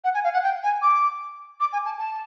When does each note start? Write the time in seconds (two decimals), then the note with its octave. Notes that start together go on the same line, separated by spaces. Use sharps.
0.04 F#5
0.14 G#5
0.24 F5
0.33 F#5
0.43 G5
0.63 G#5
0.82 D6
1.60 D6
1.73 G#5
1.85 A5
1.99 A5